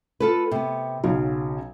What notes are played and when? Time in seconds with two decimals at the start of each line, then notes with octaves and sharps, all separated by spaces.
0.20 F4 A4 B4
0.51 C3 B3
1.04 B1 C#3 F#3